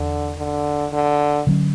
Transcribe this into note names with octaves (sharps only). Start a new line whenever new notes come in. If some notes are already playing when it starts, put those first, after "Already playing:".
Already playing: E2 D3
D3
D3
D3 F#3 C#4